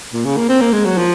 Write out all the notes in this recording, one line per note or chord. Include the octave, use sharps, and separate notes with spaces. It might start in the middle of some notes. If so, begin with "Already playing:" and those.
A#2
C#3
A#3
C4
A#3
G#3
F#3
F3